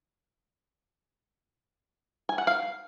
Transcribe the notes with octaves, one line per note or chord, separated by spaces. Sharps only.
G#5
F#5
F5